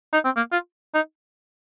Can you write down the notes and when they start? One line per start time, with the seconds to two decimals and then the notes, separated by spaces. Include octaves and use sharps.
0.13 D#4
0.25 C4
0.36 A#3
0.52 F4
0.95 D#4